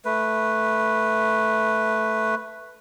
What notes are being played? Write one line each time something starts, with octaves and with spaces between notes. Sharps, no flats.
A3 B4